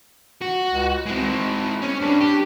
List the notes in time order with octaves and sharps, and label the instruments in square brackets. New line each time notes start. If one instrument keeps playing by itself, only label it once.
[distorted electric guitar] F#4
[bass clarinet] C#2
[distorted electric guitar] G#3 C4 [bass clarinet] E4
[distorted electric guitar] C#4
[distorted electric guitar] G2 B4 [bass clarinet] D4
[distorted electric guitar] G4